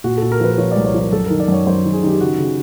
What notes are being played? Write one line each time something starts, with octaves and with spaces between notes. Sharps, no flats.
A#2 F#4
A4
A#2
A#4
F3 B4
F3 C#5
D5
C2
C#5
F3
A#4
F#2 A4
D#3 A#4
D5
F#2 C#5
F#2 C5
D#3
G#4
D#3 G4
C#3 F#4
C#3